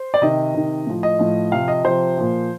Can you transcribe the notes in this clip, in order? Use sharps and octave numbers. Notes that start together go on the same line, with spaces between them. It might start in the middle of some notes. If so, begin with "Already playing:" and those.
Already playing: C5
D5
C3 D#3 D#5
C3 D#3
A2 F3
D#5
A2 F3
C3 F3 F5
D#5
C3 F3 C5
A#2 F3